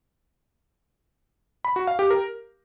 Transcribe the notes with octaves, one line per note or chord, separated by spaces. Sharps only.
B5
F#4
F5
G4
A#4